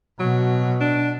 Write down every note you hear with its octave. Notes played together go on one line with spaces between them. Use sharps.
B2 F#3
D4